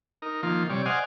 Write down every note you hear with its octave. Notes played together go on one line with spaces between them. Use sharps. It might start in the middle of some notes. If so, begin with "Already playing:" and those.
D#4 A#4
D#3 F3 A#3 F4
C3 G3 C#5 D5
C5 D5 D#5 F5 F#5 G#5